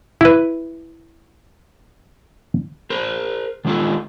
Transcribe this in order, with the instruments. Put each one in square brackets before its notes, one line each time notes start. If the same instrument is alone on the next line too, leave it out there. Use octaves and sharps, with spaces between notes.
[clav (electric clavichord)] E4 B4
[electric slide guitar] A#4 C5
D#3 G#3 A3 F4 A4